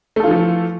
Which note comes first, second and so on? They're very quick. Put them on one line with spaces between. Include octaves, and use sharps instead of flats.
A3 A4 F4 E3 F3